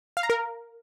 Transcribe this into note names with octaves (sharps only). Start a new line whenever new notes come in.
F5
A#5
A#4